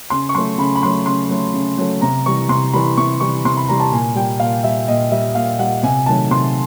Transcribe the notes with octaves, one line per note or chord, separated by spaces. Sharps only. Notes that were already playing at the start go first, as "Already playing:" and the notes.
C#3 C6
C#6
F#3 A3 C6
C#3 B5
B5
F#3 A3 C6
C#3 C6
F#3 A3
C#3
F#3 A3
C3 A#5
E3 G3 C#6
C3 C6
E3 G3 B5
C3 C#6
E3 G3 C#6
C3 C6
B5
E3 G3 A#5
A5
A#2 G#5
G3 G5
A#2 F5
G3 E5
A#2 D#5
G3 E5
A#2 F5
G3 F#5
C3 G#5
D#3 F#3 A3 A5
C3 C6